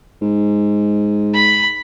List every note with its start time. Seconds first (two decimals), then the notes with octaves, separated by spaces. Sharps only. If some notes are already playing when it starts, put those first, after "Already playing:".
0.21 G#2
1.34 B5